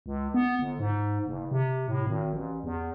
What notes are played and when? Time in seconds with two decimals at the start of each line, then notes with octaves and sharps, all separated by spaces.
0.06 C#2
0.34 B3
0.59 G1
0.79 G#2
1.26 F#1
1.51 C3
1.88 A2
2.07 G#1
2.33 A1
2.64 E2